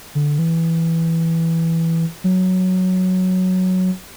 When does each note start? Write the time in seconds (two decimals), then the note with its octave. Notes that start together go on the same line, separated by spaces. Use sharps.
0.15 D3
0.39 E3
2.24 F#3